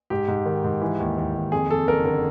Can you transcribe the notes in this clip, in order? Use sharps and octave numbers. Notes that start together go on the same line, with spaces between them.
G#2 G4
G#2
D#3
G#2
E3
D#2
D#2
D#2
F2 G#4
F2 A4
F#1 A#4
D3 A#4